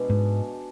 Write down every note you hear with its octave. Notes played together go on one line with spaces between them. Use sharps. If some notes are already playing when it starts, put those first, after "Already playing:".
Already playing: B2 G#3 D4
G#2